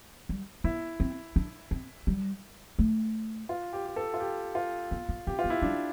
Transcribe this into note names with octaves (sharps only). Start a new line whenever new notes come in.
G3
B3 E4
C4
D4
C4
G3
A3
F4
G4
G4
A4
F4
G4
F4
B3
B3
C4 G4
F4
B3
E4
G3 D4